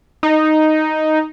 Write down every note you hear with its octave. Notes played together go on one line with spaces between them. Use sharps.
D#4